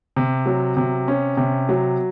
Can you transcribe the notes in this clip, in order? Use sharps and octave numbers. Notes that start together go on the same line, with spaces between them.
C3
F#3
C3
C#4
C3
F#3